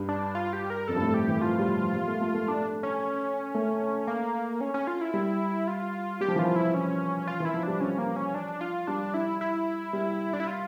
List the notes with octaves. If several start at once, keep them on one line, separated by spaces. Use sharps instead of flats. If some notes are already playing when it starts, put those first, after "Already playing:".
Already playing: G2
D4
F4
G4
A#4
F2 A4
G2
A2
G4
E3
F3 F4
G3
F3
G3
A3
A3
A3
A3 D4
C#4
A3
A#3
C#4
C#4
F4
E4
G3
F4
G3 G4
F3
E3
F3 F4
E4
C#4
F4
E3
E4
F3
G3 D4
F3 C#4
A#3
C#4
D4
F4
G3 D4
E4
E4
G3
D4
E4
F4